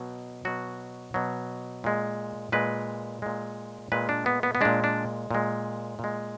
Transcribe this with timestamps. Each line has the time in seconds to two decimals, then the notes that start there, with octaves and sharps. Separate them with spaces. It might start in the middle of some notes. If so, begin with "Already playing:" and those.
Already playing: B2 F#3
0.45 B2 F#3 F#4
1.14 B2 F#3
1.84 A#2 G#3
2.52 A#2 G#3 B4
3.22 A#2 G#3
3.92 A#2 G#3 B4
4.09 D4
4.26 B3
4.43 B3
4.55 B3
4.61 A#2 G#3 D4
4.84 D4
5.31 A#2 G#3
5.99 A#2 G#3